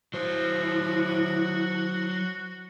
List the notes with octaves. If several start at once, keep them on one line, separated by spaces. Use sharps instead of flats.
F#3 E4 F#4 C5